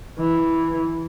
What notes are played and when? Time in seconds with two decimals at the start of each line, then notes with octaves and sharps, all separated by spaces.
0.20 E3